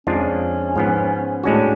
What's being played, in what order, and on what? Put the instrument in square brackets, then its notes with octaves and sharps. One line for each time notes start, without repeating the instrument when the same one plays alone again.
[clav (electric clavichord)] F2 F3 G#3 D4 F4 [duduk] C#4
[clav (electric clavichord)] G#2 F3 B3
[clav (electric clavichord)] A2 G#3 C#4 F#4 [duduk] D4